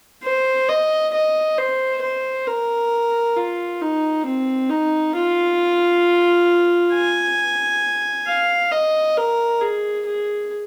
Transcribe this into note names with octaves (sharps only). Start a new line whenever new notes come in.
C5
D#5
D#5
C5
C5
A#4
F4
D#4
C4
D#4
F4
G#5
F5
D#5
A#4
G#4
G#4